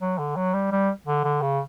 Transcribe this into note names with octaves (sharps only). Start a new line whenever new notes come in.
F#3
D3
F#3
G3
G3
D3
D3
C#3